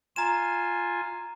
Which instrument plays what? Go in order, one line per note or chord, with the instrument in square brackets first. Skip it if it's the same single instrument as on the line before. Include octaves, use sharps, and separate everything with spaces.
[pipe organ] F4 G#5 [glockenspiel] A#5 E7